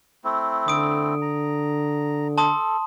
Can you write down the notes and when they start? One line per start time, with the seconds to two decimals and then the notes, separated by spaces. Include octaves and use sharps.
0.24 A3 C4 E4
0.68 D3 D#6 D7
1.22 A#5
2.38 A4 A5 C6 D#6